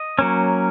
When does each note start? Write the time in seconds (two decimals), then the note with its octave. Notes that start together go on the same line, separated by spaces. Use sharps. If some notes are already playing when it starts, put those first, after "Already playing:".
Already playing: D#5
0.19 F#3 A#3 C#4